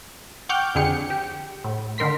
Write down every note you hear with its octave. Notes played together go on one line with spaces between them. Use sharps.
F#5 G5 C#6 D6 F6 G6
F2 D3 G4 G#4 C#7
G4
A2
D3 D#3 A#4 C6 B6